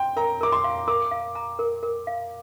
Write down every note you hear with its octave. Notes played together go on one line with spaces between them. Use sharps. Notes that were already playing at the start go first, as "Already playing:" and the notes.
Already playing: G5 C6
A#4 A#5
A#4 D6
C6
F5
A#4 D6
F5
A#5
A#4
A#4
F5